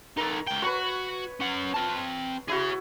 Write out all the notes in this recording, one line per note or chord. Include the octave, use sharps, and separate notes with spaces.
D#4 A4 A#4
C#2 G5
F#4 B4 C#5
C#4 F#5
C4 A5
E4 F#4 G#4 C#5